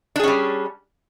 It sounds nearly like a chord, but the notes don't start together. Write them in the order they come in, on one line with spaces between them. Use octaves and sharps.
D4 G#4 C#4 G3